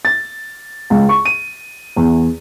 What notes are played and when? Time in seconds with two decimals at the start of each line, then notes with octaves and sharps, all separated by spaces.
0.05 A6
0.90 C#2
1.09 C#6
1.25 D#7
1.96 E2